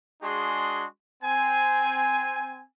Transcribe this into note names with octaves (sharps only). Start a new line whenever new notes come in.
G#3 D4 F#4 G#4 C6
C4 G#5